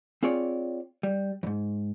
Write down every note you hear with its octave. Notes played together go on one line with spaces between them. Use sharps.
C4 F4 G#4 C#5 D5
G3
F2 G#2